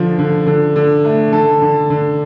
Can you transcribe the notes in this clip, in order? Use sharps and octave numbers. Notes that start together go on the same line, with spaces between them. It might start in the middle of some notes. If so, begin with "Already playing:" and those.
Already playing: D3 F3
D3
D3
D3
A3
D3 A4
D3
D3